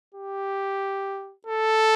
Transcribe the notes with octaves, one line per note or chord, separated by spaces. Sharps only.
G4
A4